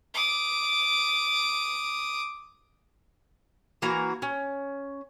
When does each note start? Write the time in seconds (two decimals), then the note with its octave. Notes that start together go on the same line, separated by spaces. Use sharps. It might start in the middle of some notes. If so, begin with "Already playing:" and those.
0.14 D6 D#6
3.82 E3 A#3 F#4 A#5
4.22 C#4